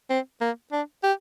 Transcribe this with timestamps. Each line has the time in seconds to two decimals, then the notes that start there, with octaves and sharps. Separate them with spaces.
0.10 C4
0.41 A#3
0.72 D4
1.03 G4